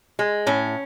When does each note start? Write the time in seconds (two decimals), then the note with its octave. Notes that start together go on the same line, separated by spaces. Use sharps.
0.19 G#3
0.47 A2 C#4